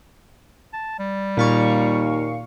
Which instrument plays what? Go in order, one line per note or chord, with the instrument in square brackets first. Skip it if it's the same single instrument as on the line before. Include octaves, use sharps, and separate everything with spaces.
[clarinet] A5
G3
[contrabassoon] D#2 [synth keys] A#2 F5 C#6